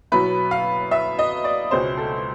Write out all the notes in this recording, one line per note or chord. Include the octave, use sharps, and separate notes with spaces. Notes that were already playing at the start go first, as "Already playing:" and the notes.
B2 F#3 B3 E4 B4
F5
E5
D#5
D5
C#2 B2 G#3 C#4 C5
A4